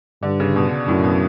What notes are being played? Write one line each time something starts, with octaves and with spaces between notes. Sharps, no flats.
G2 D3
C#3
B2
F#2 A2
B2